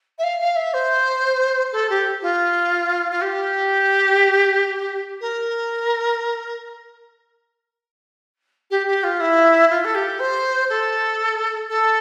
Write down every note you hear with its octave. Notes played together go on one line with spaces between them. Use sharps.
E5
F5
F5
E5
C5
A4
G4
F4
F4
G4
A#4
G4
G4
F4
E4
F4
A4
G4
C5
A4
A4